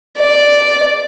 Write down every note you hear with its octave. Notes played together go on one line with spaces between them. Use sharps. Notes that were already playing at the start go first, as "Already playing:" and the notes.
D5